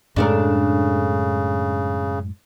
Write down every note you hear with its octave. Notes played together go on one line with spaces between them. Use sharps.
F#2 A2 C#3 G#3 D4 A4 A#4